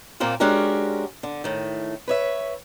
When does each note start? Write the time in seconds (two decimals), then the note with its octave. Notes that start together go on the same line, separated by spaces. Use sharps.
0.20 A#2 A#3 C4 F4
0.40 G#3 C#4 D4 F#4 G4 A#4
1.23 D3
1.44 A2 D#3
2.08 B4 C#5 E5